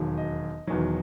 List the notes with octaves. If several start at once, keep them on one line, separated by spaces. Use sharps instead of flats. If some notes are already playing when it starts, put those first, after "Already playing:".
Already playing: E1 D#2 D#3 F#3
D#5
E1 E2 D#3 F#3